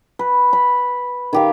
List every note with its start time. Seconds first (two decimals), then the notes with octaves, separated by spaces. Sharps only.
0.19 B4
0.53 B5
1.33 D#3 G4 F5